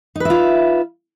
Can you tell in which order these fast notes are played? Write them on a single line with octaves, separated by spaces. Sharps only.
D#4 B4 E5 F4